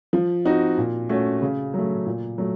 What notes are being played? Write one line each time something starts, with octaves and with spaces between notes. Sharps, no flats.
F3
C4 D#4 F#4
A#2
A3 C#4 F#4
C#3
F#3 A3
A#2
F#3 A3